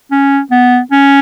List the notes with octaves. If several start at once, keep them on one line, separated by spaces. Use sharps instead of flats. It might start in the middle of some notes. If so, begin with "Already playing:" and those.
C#4
B3
C#4